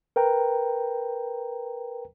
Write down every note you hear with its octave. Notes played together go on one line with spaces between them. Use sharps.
A#4 B4 G5 A#5